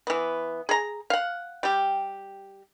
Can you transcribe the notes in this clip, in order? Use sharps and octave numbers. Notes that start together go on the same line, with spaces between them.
E3 B3
G#4 A#5
F5 F#5
G3 G4